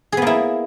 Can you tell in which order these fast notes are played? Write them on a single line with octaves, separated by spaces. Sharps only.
G#4 B3 A#3 E4